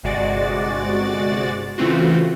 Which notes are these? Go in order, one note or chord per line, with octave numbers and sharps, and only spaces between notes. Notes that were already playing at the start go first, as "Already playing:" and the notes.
G1 C3 G#3 F#4 D5 A6
C#3 E3 A3 C4 F4 F#4